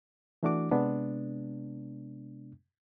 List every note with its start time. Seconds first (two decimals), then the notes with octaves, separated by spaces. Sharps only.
0.43 E3 A3 D4 F#4 D6
0.72 C3 G#3 B3 D4